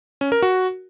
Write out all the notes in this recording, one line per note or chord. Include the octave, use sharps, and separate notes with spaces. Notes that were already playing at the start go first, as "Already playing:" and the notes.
C#4
A#4
F#4